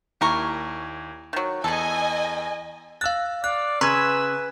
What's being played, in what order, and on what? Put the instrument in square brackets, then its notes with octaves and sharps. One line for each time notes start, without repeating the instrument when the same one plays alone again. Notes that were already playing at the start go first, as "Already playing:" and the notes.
[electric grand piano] D#2 E4 [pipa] G3 A#4 C#6
[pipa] D#3 F#3
[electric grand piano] E2 [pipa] G#4 A4 [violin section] D#5 G#5
[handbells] F5 F#6 [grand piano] E6 A6
[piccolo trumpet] D5 [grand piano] F5 [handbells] F#6
[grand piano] C#3 [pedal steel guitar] B4 G#5 [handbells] A#5 C6 C#6 [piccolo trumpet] E6